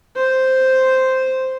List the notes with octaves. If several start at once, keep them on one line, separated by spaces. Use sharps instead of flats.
C5